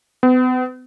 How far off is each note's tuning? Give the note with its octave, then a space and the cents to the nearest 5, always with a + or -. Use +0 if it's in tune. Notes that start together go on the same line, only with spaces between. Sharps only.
B3 +40